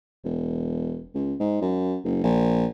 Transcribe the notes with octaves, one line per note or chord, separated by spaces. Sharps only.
E1
C#2
G#2
F#2
F#1
A#1